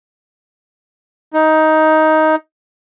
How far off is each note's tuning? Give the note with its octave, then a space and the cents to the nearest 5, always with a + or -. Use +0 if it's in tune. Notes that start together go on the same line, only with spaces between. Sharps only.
D#4 +10